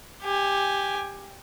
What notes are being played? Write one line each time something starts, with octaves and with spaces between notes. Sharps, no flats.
G4 G#5